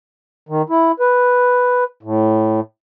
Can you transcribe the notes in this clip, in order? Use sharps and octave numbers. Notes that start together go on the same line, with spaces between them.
D#3
E4
B4
A2